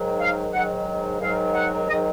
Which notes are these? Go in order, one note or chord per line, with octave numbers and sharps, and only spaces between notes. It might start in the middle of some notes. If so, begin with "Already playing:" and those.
Already playing: G#2 D#3 F#3
F5
G#2 D#3 F#3 F#5
G#2 D#3 F#3 F5
F#5
G#2 D#3 F#3 D#5